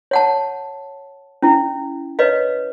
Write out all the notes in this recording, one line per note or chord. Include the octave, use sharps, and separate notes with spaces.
C#5 F#5 A5
C#4 E4
B4 C#5 D#5 F5